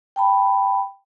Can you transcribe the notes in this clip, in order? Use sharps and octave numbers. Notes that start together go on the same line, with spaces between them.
G5 A5 B5